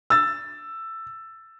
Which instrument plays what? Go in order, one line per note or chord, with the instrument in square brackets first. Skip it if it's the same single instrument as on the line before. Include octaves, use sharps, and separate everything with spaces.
[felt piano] E6 A6